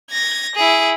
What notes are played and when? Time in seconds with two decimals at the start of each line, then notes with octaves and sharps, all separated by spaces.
0.11 G#6 A#6
0.55 E4 G#4